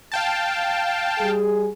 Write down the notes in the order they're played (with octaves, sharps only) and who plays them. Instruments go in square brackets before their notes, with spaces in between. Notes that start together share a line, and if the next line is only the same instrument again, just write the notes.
[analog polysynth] F5 G5 A5
[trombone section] G3 G#4